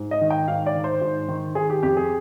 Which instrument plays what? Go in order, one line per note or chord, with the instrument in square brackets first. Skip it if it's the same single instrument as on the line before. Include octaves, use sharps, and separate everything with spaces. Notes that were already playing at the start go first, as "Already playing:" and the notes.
Already playing: [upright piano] G#2
D#5
D#3
G5
G#2 F5
D5
D#3
C5
G#2
D#3
D#3 G#4
G4
F2 G4
G#4